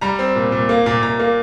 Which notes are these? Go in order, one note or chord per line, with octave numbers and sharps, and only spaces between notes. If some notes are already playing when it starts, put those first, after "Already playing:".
G3 A#5
C4
A#2
A#2
A#3
A#2
A#2 A#5
A#3